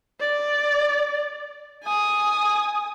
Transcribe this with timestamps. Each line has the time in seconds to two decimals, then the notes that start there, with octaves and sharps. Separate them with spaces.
0.20 D5
1.84 G#5 D#6